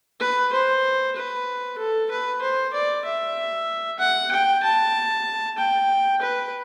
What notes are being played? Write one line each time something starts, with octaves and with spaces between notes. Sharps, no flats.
B4
C5
B4
A4
B4
C5
D5
E5
F#5
G5
A5
G5
B4